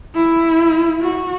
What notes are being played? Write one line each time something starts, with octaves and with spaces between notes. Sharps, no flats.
E4
F#4